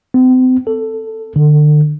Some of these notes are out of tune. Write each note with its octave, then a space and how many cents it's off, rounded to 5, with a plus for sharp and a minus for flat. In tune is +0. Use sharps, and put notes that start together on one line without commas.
C4 -40
A4 +10
D3 +35